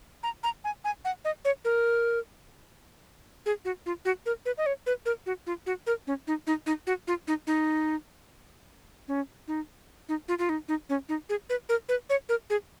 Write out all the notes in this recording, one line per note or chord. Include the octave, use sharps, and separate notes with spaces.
A#5
A#5
G#5
G#5
F#5
D#5
C#5
A#4
G#4
F#4
F4
F#4
A#4
B4
D#5
C#5
B4
A#4
F#4
F4
F#4
A#4
C#4
D#4
D#4
D#4
F#4
F4
D#4
D#4
C#4
D#4
D#4
F4
F4
D#4
D#4
C#4
D#4
G#4
B4
A#4
B4
C#5
A#4
G#4